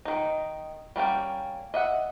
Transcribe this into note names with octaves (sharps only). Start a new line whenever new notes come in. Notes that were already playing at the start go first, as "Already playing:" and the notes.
D#3 D#4
G3 A#3 C#4 G5
D#5 E5 F#5